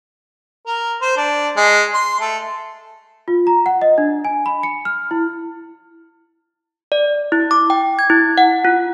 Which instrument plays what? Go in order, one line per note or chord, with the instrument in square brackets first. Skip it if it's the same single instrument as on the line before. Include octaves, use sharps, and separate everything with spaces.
[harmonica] A#4
C5
D4
G#3
C6
A3
[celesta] F4
A#5
F#5
D#5
D4
G#5
B5
C#7
F6
E4
[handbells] D5
E4
D6
G5
G#6
E4
F#5
F4